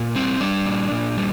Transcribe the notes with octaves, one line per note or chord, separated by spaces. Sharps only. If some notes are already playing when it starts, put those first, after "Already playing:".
Already playing: A#2
G3 C4
G3 D4
A#2
A#2
G3